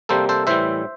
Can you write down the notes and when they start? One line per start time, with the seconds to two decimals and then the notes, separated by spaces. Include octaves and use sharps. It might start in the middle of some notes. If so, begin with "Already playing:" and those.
0.09 C3 G3 A#3 A4 C5
0.29 A4 C5
0.47 A2 E3 G3 C5 E5